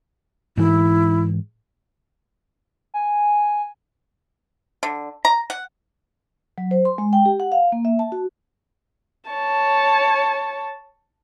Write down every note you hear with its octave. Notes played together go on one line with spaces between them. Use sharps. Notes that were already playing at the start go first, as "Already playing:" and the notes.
G#2 E3 E4
G#5
D3
A#5
F#5
F#3
C5
C6
G#3
G5
G4
F#5
F5
A#3
E5
A5
F#4
C#5 A5